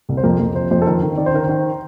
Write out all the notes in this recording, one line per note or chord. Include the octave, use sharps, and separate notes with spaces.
C2
C5
F2 A#4
F2
C3 C5
F2 C5
A4
D#3 A#4
D#3
D#3 D5
C5
D#3 A#4
C5
D#3